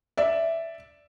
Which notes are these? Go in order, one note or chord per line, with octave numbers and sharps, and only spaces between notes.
D5 E5